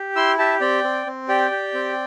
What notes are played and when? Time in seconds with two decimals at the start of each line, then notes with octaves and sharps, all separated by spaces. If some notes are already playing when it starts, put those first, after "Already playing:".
Already playing: G4
0.16 E4 C6 E6
0.38 G4 E5 A5
0.61 C4 D5 G5
0.84 C4
1.06 C4
1.28 G4 D5 G5
1.51 G4
1.74 C4